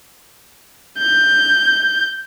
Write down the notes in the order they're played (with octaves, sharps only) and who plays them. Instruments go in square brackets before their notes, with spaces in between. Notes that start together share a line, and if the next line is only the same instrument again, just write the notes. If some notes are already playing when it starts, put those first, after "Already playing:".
[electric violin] G6